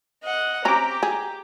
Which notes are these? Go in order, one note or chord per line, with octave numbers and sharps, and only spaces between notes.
D#5 F#5
C4 C#4 G4 A#5 D6
G#4